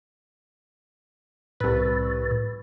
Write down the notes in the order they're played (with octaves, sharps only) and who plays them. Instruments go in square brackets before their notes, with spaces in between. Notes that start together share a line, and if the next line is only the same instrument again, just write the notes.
[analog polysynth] C2 B4 [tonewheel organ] A2